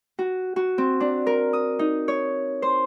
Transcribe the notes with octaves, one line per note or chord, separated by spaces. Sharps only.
F#4
F#4
C4
D4
A#4
D#6
D#4
C#5
C5